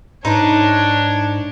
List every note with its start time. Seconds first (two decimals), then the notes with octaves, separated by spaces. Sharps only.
0.25 G#2 D4 D#4 B4 C#5